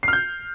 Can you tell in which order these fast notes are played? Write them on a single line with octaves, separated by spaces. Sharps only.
C7 F6 G6